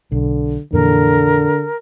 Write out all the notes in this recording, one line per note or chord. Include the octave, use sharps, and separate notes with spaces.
B1 D3
F2 A#2 D3 E3 A#4